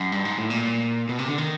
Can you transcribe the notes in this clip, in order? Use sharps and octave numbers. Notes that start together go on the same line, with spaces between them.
F#2
G2
G#2
A2
A#2
B2
C3
D3
D#3